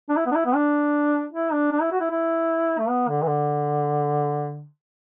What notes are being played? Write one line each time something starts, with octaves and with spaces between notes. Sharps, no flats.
D4
E4
B3
D4
E4
B3
D4
E4
D4
D4
E4
F#4
E4
E4
A3
B3
D3
E3
D3